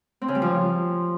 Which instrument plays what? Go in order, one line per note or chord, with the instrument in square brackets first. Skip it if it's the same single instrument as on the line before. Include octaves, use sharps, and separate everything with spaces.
[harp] C4
C#3
G3
F3